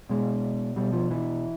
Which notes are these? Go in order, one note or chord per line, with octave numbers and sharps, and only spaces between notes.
B2 G#3
B2 G3
F3
E3